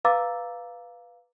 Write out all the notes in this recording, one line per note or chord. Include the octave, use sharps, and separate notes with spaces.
B4 F5 A#5 D6 E6 A6